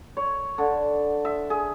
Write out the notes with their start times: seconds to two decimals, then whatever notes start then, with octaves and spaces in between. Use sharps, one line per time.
0.17 C#5
0.58 D3
1.25 E5
1.50 G#4